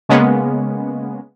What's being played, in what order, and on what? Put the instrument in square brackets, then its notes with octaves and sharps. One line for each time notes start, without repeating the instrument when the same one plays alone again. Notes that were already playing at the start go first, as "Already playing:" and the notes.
[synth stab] C#3 G#3 A#3 B3 C#4